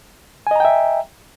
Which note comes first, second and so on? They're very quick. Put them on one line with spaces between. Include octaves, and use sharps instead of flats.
G#5 D#5 A#5 G5 E5